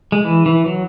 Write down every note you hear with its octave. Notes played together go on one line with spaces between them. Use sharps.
G#3
E3
E3
F#3